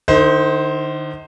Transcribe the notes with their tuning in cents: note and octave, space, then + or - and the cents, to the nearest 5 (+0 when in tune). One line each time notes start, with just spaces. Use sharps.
D#3 -45 D#4 +35 C5 +0